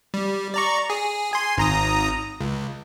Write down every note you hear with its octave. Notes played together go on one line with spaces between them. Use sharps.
G3
D5 A#5 C#6
G#4
G#5 C6
G#1 A#5 D#6
C#2